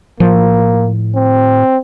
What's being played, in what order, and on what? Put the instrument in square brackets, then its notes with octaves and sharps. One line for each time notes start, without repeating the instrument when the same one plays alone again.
[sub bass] A2 [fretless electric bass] F3 [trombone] A#3
[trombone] C4